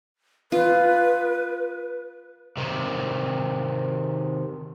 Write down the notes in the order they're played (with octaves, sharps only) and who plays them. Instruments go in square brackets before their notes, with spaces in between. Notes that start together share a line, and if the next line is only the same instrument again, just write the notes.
[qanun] F4 [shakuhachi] B4
[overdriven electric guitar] C3 D#3